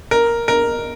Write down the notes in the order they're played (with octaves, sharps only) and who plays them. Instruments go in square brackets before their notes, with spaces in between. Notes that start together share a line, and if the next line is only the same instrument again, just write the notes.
[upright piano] A#4
A#4